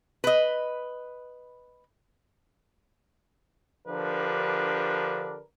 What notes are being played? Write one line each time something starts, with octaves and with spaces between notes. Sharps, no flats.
B4 D#5
D3 F3 D4 G4 A#4 B4